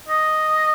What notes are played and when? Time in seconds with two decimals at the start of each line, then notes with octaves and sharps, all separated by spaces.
0.08 D#5